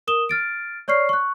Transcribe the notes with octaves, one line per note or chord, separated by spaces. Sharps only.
A#4 D#6 E7 G7
F6 A6 D7
C#5 D5 C#6 F6 C7
C#6 F#6